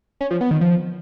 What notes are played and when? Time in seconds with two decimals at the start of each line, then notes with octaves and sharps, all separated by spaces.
0.21 C#4
0.31 F3
0.41 B3
0.51 D#3
0.61 F3